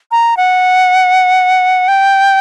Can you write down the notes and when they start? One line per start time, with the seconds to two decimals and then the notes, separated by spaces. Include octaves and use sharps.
0.12 A#5
0.37 F#5
1.88 G5